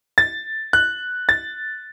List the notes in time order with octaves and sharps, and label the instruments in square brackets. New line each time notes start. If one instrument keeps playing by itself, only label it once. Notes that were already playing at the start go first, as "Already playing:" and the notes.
[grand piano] A6
F#6
A6